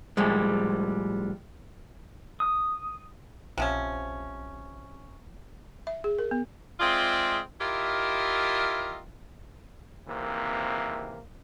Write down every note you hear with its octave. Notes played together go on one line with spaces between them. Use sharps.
A2 F3 G3 G#3
D#6
A#1 C3 F3 C#4
E5
G#4
A#4
B3
G#3 C4 F4 G#4 D5 E5
E4 F4 G4 A#4 D#5 E5
G#1 C3 E3 A#3